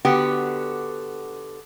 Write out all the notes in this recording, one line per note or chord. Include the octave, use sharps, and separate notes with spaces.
D3 B3 F#4 G4